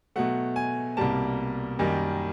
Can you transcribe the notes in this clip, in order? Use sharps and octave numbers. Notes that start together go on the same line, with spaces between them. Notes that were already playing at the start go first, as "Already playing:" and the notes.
B2 F#3 A3 F#5
G#5
C2 B2 G3 A#3 A5
F#2 D#3 G3 A#3